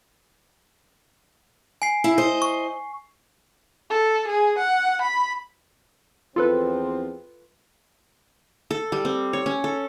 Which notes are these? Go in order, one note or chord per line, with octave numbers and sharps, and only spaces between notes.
G#5 C7
E4
C5 D#5
C#6
A4
G#4
F#5
B5
E2 F3 C4 F4 A4 B4
A4
G3
C4
C#5
C#4
A4